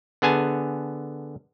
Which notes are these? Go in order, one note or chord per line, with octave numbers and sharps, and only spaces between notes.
D3 B3 G#4 G#5 A5